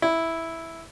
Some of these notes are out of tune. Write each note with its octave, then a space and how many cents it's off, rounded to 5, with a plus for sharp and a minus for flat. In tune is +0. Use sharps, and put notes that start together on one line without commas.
E4 -5